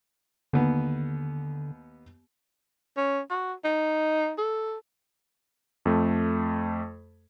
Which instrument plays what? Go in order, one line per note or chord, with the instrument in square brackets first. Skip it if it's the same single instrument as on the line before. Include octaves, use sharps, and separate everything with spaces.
[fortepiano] D#2 B3 [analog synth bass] D3
[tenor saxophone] C#4
F#4
D#4
A4
[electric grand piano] F2 A3